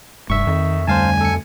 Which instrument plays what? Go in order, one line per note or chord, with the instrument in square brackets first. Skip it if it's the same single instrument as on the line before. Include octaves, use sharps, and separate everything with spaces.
[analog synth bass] F1 [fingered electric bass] G2 [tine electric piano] E5 C#6
[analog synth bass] F2 [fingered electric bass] D#3
[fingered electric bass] D2 G3 [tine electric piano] C5 F5 A5 [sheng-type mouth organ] G#5
[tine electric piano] A4 C#7